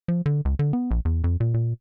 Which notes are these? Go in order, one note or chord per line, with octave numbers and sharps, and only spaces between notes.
F3
D3
C#2
D3
B3
A#1
E2
F2
A#2
A#2